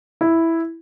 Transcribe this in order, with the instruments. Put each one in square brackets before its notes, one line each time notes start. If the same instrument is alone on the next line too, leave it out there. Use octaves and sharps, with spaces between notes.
[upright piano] E4